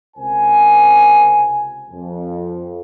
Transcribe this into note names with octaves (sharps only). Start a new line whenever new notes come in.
C#2 C3 A#4 C5 G#5
F2